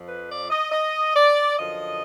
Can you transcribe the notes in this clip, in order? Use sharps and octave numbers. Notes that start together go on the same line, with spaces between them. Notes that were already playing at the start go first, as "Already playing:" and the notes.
Already playing: F2 F3
B4
D5
D#5
D#5
D5
F#2 D3 F3 D#5